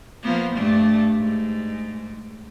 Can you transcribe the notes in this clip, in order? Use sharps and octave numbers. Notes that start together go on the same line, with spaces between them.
F3 A#3 B3
G2 A3 D4
G#2